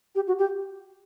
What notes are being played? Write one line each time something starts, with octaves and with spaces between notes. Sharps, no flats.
G4
F#4
G4